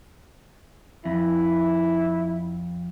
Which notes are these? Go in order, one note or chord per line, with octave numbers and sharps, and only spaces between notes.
F2 E4